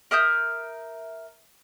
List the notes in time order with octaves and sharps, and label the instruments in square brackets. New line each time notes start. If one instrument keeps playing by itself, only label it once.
[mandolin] A#4 E5 D#6 G6